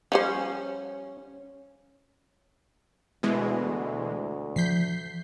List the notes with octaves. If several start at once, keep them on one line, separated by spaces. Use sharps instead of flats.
F3 G3 C#4 C5
D2 B2 E3 G#3
E3 F3 G6 B6 C7